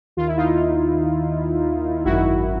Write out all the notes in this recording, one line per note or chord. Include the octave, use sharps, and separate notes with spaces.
D#2 D#3 F4
E4
D#4 F4
G#1 F#2 D#3 E4 F#4